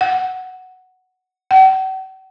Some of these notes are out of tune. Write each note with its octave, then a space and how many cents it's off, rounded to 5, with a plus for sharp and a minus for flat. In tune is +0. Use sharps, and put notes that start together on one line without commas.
F#5 +0
F#5 +45